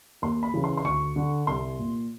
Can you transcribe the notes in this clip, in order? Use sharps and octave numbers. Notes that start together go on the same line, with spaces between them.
D#2 C6
B5
C#3 E3
C6
C6
D2 C#6
D3
C2 C6
A#2